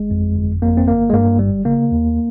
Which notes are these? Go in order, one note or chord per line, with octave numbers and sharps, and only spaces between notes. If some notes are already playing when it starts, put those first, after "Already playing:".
Already playing: G#1 G#3
F2
G1
F2 A#3
C4
G1 A#3
G#3
G2 A#3
G1 G3
C#3 A#3
D#2